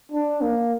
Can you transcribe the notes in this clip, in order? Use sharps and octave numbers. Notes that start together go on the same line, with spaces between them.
D4
A#3